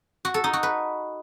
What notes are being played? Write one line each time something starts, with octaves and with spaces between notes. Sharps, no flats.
F#4
A4
D#4
F#4
B4